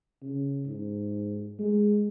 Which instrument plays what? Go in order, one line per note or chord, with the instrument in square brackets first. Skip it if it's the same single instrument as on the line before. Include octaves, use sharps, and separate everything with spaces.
[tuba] C#3
G#2
G#3